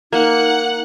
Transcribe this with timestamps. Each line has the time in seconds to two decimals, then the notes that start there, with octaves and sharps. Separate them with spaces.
0.12 A#3 D#4 F#5 F#6